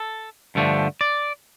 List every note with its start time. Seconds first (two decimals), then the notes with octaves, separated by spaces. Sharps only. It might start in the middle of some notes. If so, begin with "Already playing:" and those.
Already playing: A4
0.55 G2 D3 F3 A3
1.01 D5